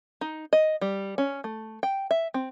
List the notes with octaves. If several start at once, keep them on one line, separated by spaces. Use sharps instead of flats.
D#4
D#5
G3
C#4
A3
G5
E5
C4